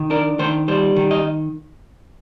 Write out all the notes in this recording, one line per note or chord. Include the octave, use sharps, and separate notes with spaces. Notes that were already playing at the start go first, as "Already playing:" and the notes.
Already playing: D#3
D4 A#4
D#3 C5
G3 C5
D#3
D#5